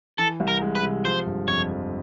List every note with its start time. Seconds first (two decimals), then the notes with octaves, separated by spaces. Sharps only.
0.18 E3 A4
0.40 C2
0.48 A#4
0.61 G#3
0.75 B4
0.83 C3
1.04 F3 C5
1.26 G1
1.48 F2 C#5
1.70 F3